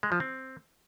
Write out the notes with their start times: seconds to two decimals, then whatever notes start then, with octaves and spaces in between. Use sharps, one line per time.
0.03 G#3
0.12 F3
0.20 C4